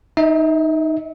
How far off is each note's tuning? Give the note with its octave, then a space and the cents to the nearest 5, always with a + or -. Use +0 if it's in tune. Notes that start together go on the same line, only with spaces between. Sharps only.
D#4 +0 E5 -35